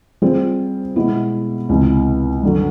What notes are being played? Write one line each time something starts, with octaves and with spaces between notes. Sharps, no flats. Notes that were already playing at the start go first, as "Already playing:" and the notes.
G3 C4 F4 G#4 C5
B2 G#3 B3 E4
C#2 C3 E3
G2 D3 F#3